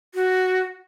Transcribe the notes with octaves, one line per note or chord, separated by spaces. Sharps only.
F#4